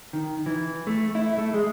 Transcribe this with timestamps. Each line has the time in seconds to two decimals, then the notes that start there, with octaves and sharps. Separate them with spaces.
0.13 D#3
0.46 E3
0.87 A3
1.15 E4
1.38 A3
1.54 G#3